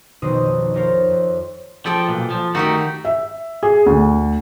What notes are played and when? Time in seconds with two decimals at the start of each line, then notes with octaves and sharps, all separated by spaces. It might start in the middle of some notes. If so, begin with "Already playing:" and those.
0.22 B1 F2 B2 D#3 C5 D#6
0.74 F4 A4 A#4 C5 C#5 F5
1.10 F2
1.86 F3 A4 D5 G5
2.08 B1 A#2
2.30 F3
2.55 D#3 A3 D#4 F#4 G4
3.05 E5
3.63 G#4
3.86 D2